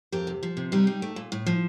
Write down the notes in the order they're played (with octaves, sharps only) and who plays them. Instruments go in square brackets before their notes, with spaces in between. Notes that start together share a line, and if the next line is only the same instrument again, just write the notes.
[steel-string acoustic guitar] F2 G4 A#4
C3
F3
C3
G3 D#4 G4
G3
A3
A#2
A2
F3